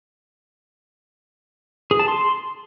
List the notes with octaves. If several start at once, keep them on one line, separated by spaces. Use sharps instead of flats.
G#4
A5
C6